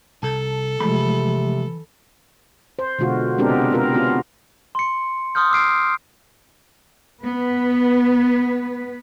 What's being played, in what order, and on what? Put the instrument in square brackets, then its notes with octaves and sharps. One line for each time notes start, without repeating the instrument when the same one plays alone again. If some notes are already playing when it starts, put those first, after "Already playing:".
[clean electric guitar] C2 [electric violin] A4 [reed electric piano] A5
[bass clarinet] C3 [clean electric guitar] E3 B5 [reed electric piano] F3 G#3 A3
[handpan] C5
B2 D3 G#3 F4 F#4
G#3 B3 C4 D4 G4 A#4
C3
B3 F4 A#4
B3 C#4 F4 F#4
[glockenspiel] C6 C#7
C6 D#6 F6 G6
D6 E6 F6 C7 D7
[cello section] B3 B4